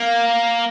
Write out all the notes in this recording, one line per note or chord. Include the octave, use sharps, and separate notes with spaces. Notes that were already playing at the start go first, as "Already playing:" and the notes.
Already playing: A#3